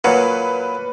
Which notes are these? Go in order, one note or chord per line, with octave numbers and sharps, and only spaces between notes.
A#2 F#3 B4